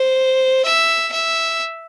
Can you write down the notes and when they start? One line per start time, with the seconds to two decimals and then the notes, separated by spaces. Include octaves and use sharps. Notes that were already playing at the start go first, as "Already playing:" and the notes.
Already playing: C5
0.65 E5
1.12 E5